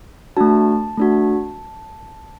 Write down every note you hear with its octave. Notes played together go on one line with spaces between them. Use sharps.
A3 D4 F#4 A5
A3 D4 F#4